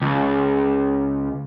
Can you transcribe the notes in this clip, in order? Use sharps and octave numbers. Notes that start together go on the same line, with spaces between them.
C#2